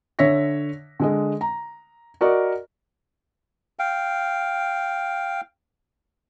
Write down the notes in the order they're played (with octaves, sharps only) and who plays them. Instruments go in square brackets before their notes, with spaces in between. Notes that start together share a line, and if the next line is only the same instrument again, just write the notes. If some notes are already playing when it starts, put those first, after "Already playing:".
[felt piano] D3 C#5 E5 A#6 B6
D3 G#3 D#5
A#5
F#4 A#4 D5 D#5
[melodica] F5 G5